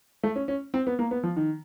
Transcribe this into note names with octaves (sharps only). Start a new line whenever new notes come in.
A3
C#4
C#4
C4
B3
A#3
B3
F3
D#3